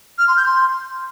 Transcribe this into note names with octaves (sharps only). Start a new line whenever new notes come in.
F6
C6
G6
C6